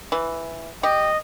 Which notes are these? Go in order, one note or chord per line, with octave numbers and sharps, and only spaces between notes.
E3
G4 D#5